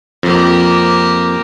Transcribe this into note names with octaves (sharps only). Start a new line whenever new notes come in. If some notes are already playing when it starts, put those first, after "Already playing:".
F2 A#3 G4